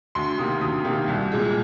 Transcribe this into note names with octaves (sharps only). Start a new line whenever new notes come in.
D2 C6
C3 D#3 A#3 D#6
D2 D#6
C3 D#3 A#3
C2
A#2 G#3